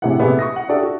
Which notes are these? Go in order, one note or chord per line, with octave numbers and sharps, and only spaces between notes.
A#1 A2 C3 E4 G#4 F#5
C3 A3 B3 G4 G#4
C#6 D#6 A#6
F#5
D4 F#4 G4 A4 D5 E5
F#4